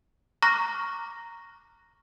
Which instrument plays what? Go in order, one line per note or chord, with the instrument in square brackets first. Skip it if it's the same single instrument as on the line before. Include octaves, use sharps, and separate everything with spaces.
[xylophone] A#5 C#6 D6 F6 F#6 A#6